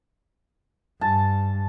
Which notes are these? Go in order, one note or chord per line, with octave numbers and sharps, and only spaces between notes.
G2 A5